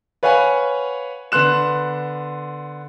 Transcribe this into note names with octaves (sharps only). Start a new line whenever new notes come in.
B4 C#5 F5 F#5 G#5
D3 B3 C6 F#6 E7